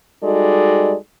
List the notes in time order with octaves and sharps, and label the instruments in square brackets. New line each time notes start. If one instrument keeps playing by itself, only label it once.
[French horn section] G3 G#3 D#4 F#4 A4 D5